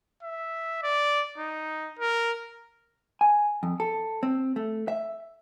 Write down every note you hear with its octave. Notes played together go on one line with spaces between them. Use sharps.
E5
D5
D#4
A#4
G#5
F2
A4
C4
A3
E5